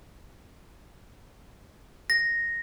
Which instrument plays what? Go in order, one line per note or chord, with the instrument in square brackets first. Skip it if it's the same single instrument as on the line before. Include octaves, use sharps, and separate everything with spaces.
[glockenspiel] A#6